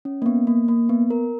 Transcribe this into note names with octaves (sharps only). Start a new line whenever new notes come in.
C#4
A#3
B3
A#3
A#3
B3
A#4